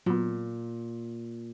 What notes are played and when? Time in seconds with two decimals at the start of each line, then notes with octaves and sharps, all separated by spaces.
0.06 A#2 F#3 B3